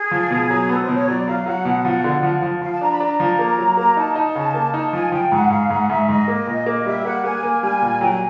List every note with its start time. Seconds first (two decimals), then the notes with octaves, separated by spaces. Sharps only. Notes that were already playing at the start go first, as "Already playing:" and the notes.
Already playing: G#4
0.11 F3
0.31 B2
0.50 F#3
0.69 B3 A4
0.82 C5
0.88 B2
0.95 C#5
1.08 F#3 D5
1.27 F#3 F5
1.46 F#3 F#5
1.65 B2
1.85 F3
2.04 D3
2.23 F3
2.42 F3
2.62 F3 F5
2.72 A5
2.81 D4 A#5
2.91 B5
3.00 D4 A#5
3.20 F3
3.39 A#3
3.58 F#3
3.77 A#3 A#5
3.97 D#4 A5
4.16 D#4
4.35 C#3
4.54 A#3
4.74 D#4
4.93 F3 G#5
5.12 F3 G5
5.31 G#2 F#5
5.50 G#2 F5
5.70 G#2 F#5
5.90 G#2 E5
6.09 G#2 D#5
6.28 A#3
6.47 A#2
6.66 A#3
6.85 G3 E5
7.05 A#3 F#5
7.24 A#3 G#5
7.43 A#3
7.62 G3 G#5
7.82 A#2
8.01 F#3 G5
8.10 G#5